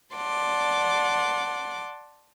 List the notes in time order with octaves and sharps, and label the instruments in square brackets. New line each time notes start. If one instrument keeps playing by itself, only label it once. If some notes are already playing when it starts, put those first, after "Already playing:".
[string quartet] D5 F#5 A5 C6 D6